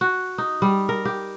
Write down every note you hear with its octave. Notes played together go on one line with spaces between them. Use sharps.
F#4
D#4
G3
A#4
G4